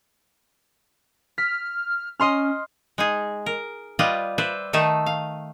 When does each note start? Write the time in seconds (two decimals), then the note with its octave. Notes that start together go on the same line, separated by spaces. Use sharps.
1.38 F6 B6
2.20 C#4 D#5 C6 F6
2.98 G#3 D#4 G#4
3.46 A#4
3.99 G3 F4 B4 D5 D#5
4.38 B4 C5 D5 E5
4.73 D#3 A3 D#4 E5 A5
5.06 F5